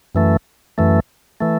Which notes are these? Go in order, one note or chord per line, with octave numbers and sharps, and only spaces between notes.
F#2 E3 A3
F#2 E3 A3
E3 A3